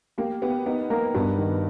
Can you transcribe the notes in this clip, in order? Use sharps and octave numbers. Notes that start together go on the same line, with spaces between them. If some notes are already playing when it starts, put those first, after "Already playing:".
A#3 G4
B3 G4
B3 D#4
A#3 A#4
G2 B3
D#3